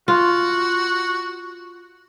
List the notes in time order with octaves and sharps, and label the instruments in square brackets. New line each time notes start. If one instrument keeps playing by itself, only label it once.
[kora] F4 [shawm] F#4